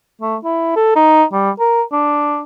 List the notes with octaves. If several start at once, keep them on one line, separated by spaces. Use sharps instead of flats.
A3
E4
A4
D#4
G3
A#4
D4